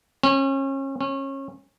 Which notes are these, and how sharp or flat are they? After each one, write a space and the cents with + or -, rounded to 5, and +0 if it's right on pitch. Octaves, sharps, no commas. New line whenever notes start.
C#4 -30
C#4 -25